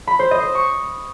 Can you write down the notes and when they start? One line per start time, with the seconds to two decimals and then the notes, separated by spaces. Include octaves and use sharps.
0.07 B5
0.19 C5
0.31 D#5
0.43 C5
0.55 C#6